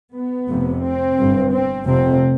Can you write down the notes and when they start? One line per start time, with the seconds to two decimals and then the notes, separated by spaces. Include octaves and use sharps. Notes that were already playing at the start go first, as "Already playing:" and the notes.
0.13 B3
0.47 F1 F2 C3
0.82 C4
1.17 G1 G2
1.51 C4
1.85 F1 F2 C3 C4